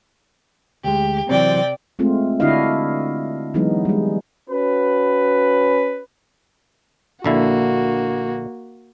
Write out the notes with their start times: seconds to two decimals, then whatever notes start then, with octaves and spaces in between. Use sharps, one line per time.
0.84 D2 G#3 G4
1.29 C3 E3 F#3 C4 D5 G5
1.99 G#3 A3 C4 F4
2.40 D3 D4 E4 F#4 D#5 F5
3.54 E3 F#3 G#3 B3 D#4
3.85 G3 G#3
4.49 C#4 F#4 B4
7.24 A#1 D3 A#3 E4 F#4